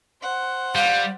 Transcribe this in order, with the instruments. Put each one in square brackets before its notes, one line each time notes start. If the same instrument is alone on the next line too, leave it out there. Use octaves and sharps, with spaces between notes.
[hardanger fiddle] C5 F#5
[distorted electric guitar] G3 [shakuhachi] F5